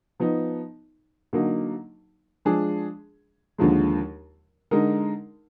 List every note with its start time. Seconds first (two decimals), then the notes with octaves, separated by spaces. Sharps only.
0.20 F3 B3 D#4
1.33 D3 F#3 A#3 D#4
2.45 F3 G#3 D4 G#4
3.58 D#2 D3 F3 G#3
4.71 D3 G#3 D#4 A#4